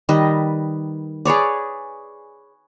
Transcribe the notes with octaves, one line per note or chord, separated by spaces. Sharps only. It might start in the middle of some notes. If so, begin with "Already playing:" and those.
D#3 G3 B4 D#5
G#4 B4 C#5 D5